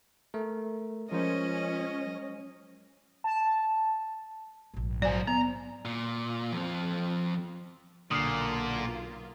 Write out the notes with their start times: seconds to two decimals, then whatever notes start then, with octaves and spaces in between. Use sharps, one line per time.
0.34 A3 A#4
1.11 F3 G#3 C#4 F4 A#4 C5 D#5
2.06 F#3
3.24 A5
4.74 A#1 G#2
5.02 F#3 C5 D5 G#5
5.27 B3 A#5
5.85 A#2
6.53 F2 F3
8.11 B1 A#2 D3 A#3 F4 D#6 F6 C7